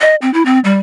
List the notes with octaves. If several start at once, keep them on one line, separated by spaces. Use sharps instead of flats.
D#5
C4
E4
C4
G3